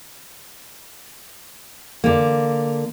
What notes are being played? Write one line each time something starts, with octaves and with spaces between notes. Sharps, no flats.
D3 A#3